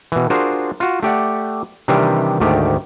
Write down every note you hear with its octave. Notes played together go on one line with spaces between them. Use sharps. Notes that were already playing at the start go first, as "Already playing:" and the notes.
B2 E3
D4 F4 F#4 G#4 A#4 C5
F4 F#4
A3 G4 D5 F#5
C3 D#3 E3 G3 D4 G4
D2 G#2 D#3 A3 G4 D5